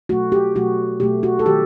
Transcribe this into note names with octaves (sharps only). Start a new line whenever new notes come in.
B2 F#3 A3 F#4
G4
B2 F#3 A3 F#4
B2 F#3 A3 G4
F#4
A4
D#3 F#3 A3 G4